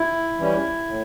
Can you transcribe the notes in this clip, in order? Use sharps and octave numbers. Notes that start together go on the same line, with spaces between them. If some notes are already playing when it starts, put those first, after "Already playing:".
Already playing: E4
E3 G3 C#4
A2